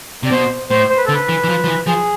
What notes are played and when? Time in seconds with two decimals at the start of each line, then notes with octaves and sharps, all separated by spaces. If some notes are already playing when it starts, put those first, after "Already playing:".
0.23 C3 D5
0.31 B2 C5
0.70 A2 C5
0.89 C5
0.97 B4
1.06 A4
1.09 D3
1.14 B4
1.29 E3
1.44 E3
1.49 F3
1.64 F3
1.67 E3
1.87 F3 G#4